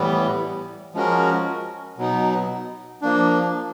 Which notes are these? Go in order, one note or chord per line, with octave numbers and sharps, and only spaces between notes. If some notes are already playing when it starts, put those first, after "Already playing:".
Already playing: A2 E3 G3 B3
F3 G#3 C#4 F#4 A#4
B2 F#3 B3 D#4
F3 A#3 D4